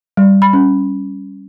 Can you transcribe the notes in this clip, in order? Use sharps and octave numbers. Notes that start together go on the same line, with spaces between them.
G3
B5
C#4